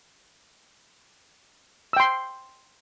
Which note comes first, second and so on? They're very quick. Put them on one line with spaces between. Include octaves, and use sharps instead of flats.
E6 G5 C6